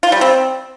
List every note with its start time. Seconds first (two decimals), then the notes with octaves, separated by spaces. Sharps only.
0.03 F4
0.12 G3
0.21 C4